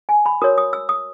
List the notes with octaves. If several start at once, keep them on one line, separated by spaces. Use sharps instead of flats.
G#5
B5
F#4 A#4 C#5 D#6
D#6
E6
D#6